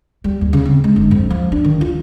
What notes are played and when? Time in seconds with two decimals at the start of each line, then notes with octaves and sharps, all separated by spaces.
0.24 G3
0.41 D#2
0.53 C#3
0.65 C4
0.84 G#3
0.96 G1
1.11 F2
1.30 F3
1.52 D4
1.64 D#3
1.81 F4